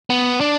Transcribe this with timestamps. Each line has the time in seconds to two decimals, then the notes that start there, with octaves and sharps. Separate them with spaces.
0.10 B3
0.41 D4